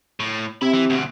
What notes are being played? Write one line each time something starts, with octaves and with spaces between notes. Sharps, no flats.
A2
C3 E5 B5
E3
D2 B2